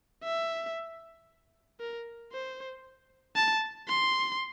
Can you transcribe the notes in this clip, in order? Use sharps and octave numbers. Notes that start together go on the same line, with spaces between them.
E5
A#4
C5
A5
C6